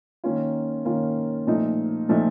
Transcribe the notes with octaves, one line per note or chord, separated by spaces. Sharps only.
D#3 A#3 C#4 F4
D#3 A#3 C#4 F4
A#2 F3 A3 D#4
A#2 F3 A3 D#4